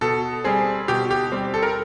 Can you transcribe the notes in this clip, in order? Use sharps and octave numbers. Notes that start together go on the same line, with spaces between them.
B2 A4
G3 C4 G#4
B2 G4
G4
G3 C4
A4
A#4